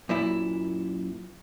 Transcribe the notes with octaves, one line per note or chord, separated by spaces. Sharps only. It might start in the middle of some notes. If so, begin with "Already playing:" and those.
F#2 A#2 E4